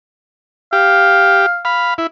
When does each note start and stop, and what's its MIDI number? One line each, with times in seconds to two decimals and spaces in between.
0.73 1.46 67
0.73 1.63 77
1.65 1.94 77
1.65 1.94 83
1.98 2.07 64